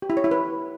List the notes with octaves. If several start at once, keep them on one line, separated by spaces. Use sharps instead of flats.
G4
E4
C#5
E4
B4